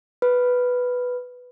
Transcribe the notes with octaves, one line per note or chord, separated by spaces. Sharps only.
B4